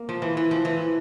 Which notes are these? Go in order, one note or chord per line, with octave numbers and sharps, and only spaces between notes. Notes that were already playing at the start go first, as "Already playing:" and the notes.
Already playing: A#3
F3
E3
E3
F3
E3